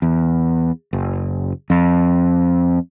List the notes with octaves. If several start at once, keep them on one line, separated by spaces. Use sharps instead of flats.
E2
F#1
F2